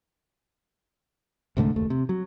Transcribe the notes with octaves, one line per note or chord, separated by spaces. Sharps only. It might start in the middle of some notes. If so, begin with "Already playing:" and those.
C2 G#2 D3 A3
F#1 D#2 A3
C3
F#3